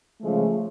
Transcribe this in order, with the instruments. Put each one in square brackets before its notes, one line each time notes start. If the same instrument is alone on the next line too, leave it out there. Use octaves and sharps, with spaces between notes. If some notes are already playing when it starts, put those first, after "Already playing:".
[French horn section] C#3 F3 G#3 A3